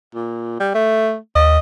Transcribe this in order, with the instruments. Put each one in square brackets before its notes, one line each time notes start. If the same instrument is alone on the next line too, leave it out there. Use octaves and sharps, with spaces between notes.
[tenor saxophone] A#2
G3
A3
[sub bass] D#2 [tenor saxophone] D#5